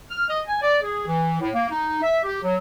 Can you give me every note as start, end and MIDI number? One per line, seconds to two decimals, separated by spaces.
0.09 0.27 89
0.28 0.40 75
0.46 0.59 80
0.61 0.76 74
0.81 1.05 68
1.06 1.38 52
1.40 1.48 45
1.53 1.65 58
1.69 1.97 63
2.02 2.18 76
2.24 2.37 67
2.42 2.55 54